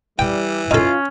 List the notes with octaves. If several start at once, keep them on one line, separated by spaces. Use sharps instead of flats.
E3 G3 G5
C#4 D#4 F4 A4